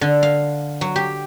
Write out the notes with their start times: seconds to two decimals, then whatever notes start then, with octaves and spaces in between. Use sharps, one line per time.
0.01 D3
0.23 F5
0.81 F#3
0.96 G4